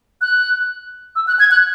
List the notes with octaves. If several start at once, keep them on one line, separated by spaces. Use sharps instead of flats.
F#6
E6
F#6
G#6
F#6